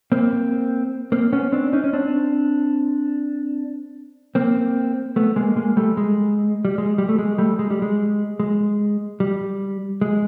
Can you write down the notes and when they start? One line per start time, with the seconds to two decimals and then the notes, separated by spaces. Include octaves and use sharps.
0.12 A#3 C4
1.12 A#3 C4
1.33 B3 C#4
1.52 C4 D4
1.73 C#4 D#4
1.84 C#4
1.93 C4 D4
4.35 A#3 C4
5.16 A3 B3
5.36 G#3 A#3
5.57 G#3 A#3
5.77 G3 A3
5.97 G#3
6.65 G3
6.78 G#3
6.98 G3
7.09 A3
7.18 G#3
7.38 G3 A3
7.59 G#3
7.70 G3
7.82 G#3
8.40 G#3
9.20 G3
10.01 G#3